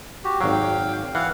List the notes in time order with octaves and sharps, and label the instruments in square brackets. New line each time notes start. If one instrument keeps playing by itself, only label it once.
[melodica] F#4 G4
[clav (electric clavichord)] G#1 F#3 [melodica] F5 G5
[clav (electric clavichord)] E3 [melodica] F5 F#5